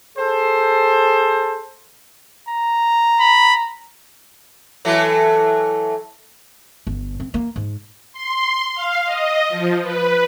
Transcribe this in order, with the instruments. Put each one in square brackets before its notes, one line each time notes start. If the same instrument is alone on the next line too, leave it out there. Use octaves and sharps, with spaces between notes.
[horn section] G#4 A4 C5
[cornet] A#5
[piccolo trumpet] B5
[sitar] E3 F#3 A3
[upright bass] G1
C4
A#3
G#2
[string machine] C6
F5
D#5
F3
B4